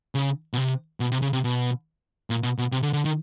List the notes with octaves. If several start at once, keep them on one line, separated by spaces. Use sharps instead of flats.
C#3
B2
C3
B2
C3
C#3
C3
B2
A#2
B2
B2
C3
D3
D3
D#3